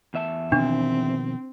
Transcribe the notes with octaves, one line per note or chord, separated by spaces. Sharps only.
E2 E5 A5
B2 D#3 F3 C4 D4